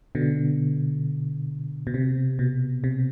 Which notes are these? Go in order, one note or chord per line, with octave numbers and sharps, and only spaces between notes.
B2 D3
B2
C3
B2
C3